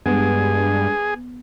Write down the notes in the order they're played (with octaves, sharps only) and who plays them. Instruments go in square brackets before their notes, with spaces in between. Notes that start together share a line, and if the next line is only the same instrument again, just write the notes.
[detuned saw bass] G2 [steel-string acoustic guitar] G#3 D4 [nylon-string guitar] B3 [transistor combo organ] G#4